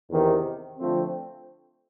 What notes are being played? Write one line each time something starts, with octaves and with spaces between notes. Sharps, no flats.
E2 C3 D#3
D3 F3 A3 C4